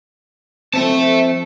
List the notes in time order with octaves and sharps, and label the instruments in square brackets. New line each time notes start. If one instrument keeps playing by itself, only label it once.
[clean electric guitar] F3 C4 [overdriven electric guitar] E5 A5